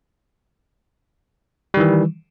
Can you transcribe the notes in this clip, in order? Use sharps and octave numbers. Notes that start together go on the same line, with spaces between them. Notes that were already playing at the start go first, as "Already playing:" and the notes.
D#3 E3 G3